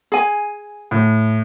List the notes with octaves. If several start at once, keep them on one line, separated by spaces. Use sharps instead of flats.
G#4 G#5
A2